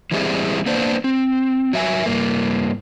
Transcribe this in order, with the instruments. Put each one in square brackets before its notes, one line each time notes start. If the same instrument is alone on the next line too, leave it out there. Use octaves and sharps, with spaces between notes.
[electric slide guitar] E3 G3 G#3 C4 E4 G#4
A#3 B3 D4 C5
C4
F#3 E5 G#5
G2 A#3